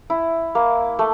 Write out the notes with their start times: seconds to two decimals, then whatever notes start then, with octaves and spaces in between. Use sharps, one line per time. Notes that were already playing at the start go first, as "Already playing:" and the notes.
0.10 E4
0.55 A#3
0.99 A3